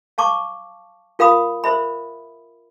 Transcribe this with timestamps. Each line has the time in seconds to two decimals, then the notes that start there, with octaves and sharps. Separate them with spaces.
0.18 F5 A5 C#6 D6
1.19 F4 A#4 F5 B5 D#6
1.64 A#4 C5 E5 B5